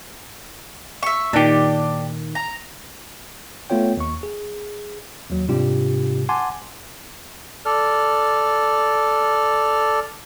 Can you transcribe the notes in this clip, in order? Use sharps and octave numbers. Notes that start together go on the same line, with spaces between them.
E5 C#6
A#2 D#3 D4 G4
A#5
A3 B3 F4 C#5 G5
D#2 C#6
G#4
D#2 F#3
G#2 C3 G3 D4 F4 G4
F#5 G#5 A5 C6 D6
A4 D5 F6